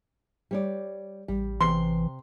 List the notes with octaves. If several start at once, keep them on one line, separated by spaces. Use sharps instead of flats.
G3 C#5 D5
A1 G3
C3 E3 C6